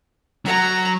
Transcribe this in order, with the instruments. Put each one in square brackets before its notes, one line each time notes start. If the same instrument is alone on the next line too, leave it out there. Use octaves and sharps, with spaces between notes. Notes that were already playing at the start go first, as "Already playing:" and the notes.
[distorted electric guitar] F#3 [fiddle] A#5